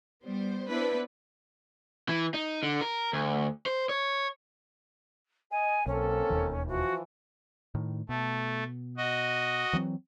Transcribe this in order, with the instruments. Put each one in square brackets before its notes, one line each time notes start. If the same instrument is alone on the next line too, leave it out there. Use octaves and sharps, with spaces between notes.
[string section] G3 B3 C5
B3 D4 E4 B4 C5
[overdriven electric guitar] E3
D#4
D3
A#4
D2
C5
C#5
[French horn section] D#5 [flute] G#5
[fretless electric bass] B1 [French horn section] A#3 C4 A4 [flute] C#4
[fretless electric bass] E1 D#2 D#3
[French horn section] E3 F3 [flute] F#4
[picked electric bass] A2 D#3
[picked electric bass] B2 [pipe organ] A3
[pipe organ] F#4 D#5
[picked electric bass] E3 F#3 C4